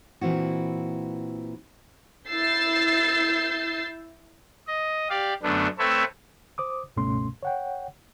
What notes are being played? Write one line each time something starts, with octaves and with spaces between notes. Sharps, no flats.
A#2 E3 C4 E4 F#4
E4 E6 G6 A6 C7
D#5
G4 D5 F5
F#2 D3 A3 B3 D4
A3 C4 A4 B4 C#5 E5
C5 D6 D#6
C#2 G2 B2 A3 C#4 C6
C#5 F#5 G5